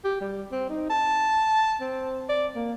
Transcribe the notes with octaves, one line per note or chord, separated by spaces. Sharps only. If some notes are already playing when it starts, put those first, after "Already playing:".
G4
G3
C4
D#4
A5
C4
D5
A#3